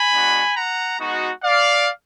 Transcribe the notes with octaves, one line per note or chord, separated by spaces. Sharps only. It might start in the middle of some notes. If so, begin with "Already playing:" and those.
Already playing: G#5 B5
G#3 B3 D4 F#4
F#5 A#5
G#3 B3 D#4 F#4
D5 F5